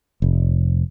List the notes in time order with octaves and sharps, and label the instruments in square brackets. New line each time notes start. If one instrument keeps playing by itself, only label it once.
[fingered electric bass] F1